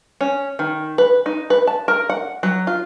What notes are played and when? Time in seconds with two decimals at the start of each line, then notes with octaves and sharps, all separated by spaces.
0.21 C#4
0.59 D#3
0.98 B4
1.26 D#4
1.50 B4
1.67 A5
1.88 A#4
2.10 F#5
2.43 F#3
2.67 F4